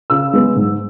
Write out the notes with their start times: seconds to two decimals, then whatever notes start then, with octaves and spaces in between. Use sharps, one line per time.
0.10 C#3 E6
0.33 G#3 B3
0.56 G#2